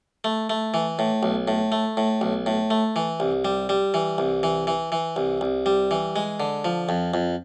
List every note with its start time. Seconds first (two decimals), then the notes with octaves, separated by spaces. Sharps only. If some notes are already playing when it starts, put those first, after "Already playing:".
0.24 A3
0.50 A3
0.74 E3
0.99 A2
1.23 B1
1.48 A2
1.72 A3
1.97 A2
2.21 B1
2.46 A2
2.70 A3
2.96 E3
3.20 C2
3.45 G3
3.69 G3
3.94 E3
4.18 C2
4.43 E3
4.67 E3
4.92 E3
5.16 C2
5.41 C2
5.66 G3
5.91 E3
6.16 G#3
6.40 D3
6.65 F3
6.89 F2
7.14 F2